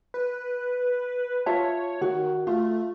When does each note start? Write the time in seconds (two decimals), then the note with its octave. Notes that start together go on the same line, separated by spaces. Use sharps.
0.14 B4
1.46 F4 C#5 E5 A5
2.01 D#3 F#4
2.47 A3 F4